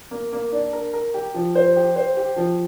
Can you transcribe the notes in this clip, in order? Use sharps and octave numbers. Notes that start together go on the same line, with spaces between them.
A#3
A#3
D4
A#4
A#4
G4
F3
C5
G4
C5
G4
F3